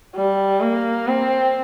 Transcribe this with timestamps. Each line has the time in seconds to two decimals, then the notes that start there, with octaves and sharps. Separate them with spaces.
0.15 G3
0.61 A#3
1.07 C4